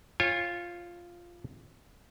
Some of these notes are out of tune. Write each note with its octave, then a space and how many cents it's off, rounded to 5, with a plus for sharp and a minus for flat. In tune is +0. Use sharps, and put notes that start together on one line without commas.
F4 +0 C#5 -30 G#5 -45